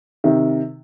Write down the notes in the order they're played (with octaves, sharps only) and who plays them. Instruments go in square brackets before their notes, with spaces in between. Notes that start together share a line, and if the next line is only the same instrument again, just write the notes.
[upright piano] C3 D#3